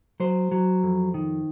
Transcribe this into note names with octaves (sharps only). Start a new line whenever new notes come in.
F#3 C5
F#3
F2
D#3